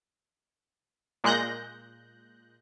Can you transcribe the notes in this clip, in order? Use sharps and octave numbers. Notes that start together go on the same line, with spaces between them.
A#2 G#3 F#6 G6 A#6